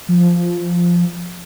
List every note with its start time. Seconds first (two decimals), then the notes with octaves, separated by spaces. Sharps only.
0.08 F3